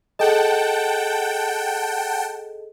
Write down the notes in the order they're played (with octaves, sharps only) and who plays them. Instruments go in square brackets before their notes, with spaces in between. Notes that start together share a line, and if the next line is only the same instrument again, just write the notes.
[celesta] G#4 A4 D#5 [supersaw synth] F#5 G5 A5